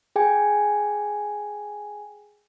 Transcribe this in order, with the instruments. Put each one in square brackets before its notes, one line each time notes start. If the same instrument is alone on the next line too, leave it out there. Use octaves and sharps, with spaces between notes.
[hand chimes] G#4 G5 G#5